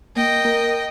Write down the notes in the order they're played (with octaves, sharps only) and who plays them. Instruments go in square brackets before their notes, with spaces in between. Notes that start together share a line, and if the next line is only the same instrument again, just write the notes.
[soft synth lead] A#3 [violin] D#5 G5
[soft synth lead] A#4